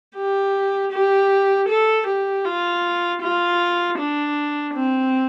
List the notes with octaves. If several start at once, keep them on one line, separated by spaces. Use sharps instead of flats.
G4
G4
A4
G4
F4
F4
D4
C4